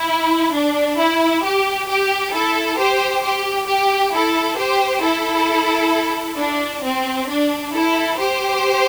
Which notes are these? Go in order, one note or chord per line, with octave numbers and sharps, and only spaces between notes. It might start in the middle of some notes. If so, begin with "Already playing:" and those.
Already playing: E4
D4
E4
G4
G4
E4 A4
G4 C5
G4
G4
E4 A4
G4 C5
E4 A4
D4
C4
D4
E4 A4
G4 C5